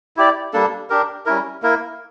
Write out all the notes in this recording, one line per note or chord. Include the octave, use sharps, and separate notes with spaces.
E4 G4 D5
G3 A#3 D4 A4
D4 G4 A#4
G3 C#4 E4 A#4
A#3 E4 A#4